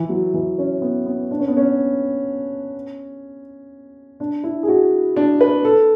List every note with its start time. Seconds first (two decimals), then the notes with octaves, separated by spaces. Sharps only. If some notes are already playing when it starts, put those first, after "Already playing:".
Already playing: E3
0.09 F#3
0.34 E3
0.58 C#4
0.81 B3
1.06 B3
1.31 D4
1.40 C#4
1.48 B3
1.57 C#4
4.20 D4
4.44 E4
4.63 G#4
4.68 F#4
5.16 D4
5.41 B4
5.65 A4